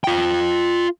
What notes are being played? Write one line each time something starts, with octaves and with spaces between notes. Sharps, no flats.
F4 G5